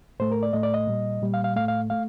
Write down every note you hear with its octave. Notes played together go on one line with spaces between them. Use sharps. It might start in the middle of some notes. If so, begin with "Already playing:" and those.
A2 A3 C5
A#4
D5
A2 A3 D#5
D5
D#5
A#2 G3
A#2 G3
F5
F5
A2 A3 F5
F5
A3 F5